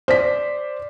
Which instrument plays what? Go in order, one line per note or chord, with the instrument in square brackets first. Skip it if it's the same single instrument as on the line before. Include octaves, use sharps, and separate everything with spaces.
[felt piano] C5 D5 B6